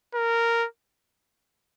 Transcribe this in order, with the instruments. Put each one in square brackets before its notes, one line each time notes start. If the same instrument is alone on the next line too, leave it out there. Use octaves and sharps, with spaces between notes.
[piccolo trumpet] A#4